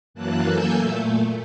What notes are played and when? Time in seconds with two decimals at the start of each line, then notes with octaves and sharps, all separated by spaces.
0.14 F#2 E3 F#3 A#3 A5 F#6
0.47 A#3 A4 G#5 E6 G6
0.76 A#2 A3